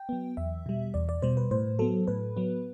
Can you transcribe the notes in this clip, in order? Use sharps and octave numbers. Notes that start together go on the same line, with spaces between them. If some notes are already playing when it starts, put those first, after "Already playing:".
Already playing: G5
F#3 B3
E2 E5
B2 G3
E2 D5
D5
B2 G3 C5
B4
A2 C5
F#3 B3 A4
A2 B4
F#3 B3